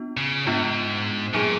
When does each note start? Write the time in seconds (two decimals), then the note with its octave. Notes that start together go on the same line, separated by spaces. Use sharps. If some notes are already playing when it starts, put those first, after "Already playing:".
Already playing: B3 D4 F4
0.17 C#3
0.46 G#2 B3 D4 F4
1.34 A#2 F#3 B3 D#4 G#4